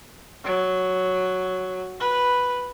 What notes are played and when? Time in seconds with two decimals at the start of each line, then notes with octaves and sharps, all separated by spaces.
0.44 F#3
2.00 B4